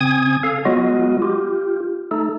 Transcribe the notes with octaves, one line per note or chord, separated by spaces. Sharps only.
C#3 C4 G#5 D#6 G#6
A4 F5
F#3 G#3 B3 F4 F#4 D#5
F4 G4
A3 D#4 A4